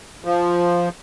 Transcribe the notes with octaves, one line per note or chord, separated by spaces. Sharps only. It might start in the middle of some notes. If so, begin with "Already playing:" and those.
F3